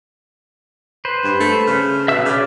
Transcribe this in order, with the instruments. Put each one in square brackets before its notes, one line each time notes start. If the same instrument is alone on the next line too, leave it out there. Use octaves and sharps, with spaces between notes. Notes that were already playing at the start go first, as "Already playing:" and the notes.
[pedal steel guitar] B4 C5
[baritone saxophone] G2
A3
C#3
[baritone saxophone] B2 [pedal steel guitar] E5 E6
[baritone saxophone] C#3 [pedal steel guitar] C#5 D5 D6